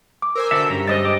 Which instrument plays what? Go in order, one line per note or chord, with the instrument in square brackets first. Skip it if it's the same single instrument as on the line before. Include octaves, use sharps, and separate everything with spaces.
[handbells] D6
[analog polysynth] A#4 C5 G#5 [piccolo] E6
[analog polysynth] D3 G5 [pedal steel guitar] F#4 A4 E5
[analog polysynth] G2 [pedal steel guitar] C#4 A#5
[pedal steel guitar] G3 G#3 [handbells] C5 D#6 A6 [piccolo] D#5
[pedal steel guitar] G5 D6